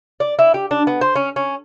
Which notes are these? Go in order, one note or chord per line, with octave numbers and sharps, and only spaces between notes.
D5
E4
G4
D4
B3
C5
C#4
C#4